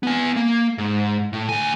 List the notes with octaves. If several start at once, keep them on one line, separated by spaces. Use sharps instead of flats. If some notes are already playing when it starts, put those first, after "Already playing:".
B3 G#5
A#3
G#2
A2
D2 G#5